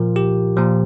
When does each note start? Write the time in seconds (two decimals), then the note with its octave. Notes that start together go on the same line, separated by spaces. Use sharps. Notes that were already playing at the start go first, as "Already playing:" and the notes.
Already playing: A#2 F3 F4 A#4
0.16 G4
0.57 A#2 F3